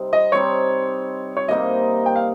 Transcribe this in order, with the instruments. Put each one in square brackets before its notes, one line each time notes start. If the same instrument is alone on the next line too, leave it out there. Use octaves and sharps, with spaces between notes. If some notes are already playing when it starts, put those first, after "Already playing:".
Already playing: [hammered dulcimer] C3 G3 C4 D#4
[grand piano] D#5
[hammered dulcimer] G3 C4 D#4 [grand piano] C#5
[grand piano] C#5
[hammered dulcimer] C3 G3 A#3 D#4 [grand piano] D#5
[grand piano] G5
F5